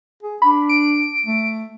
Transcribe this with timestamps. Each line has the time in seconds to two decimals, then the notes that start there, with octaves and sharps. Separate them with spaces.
0.23 G#4
0.42 D4 B5
0.69 D7
1.26 A3